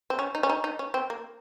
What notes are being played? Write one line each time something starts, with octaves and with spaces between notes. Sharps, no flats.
C4
C#4
D#4
C#4
D#4
D#4
C#4
C4
A#3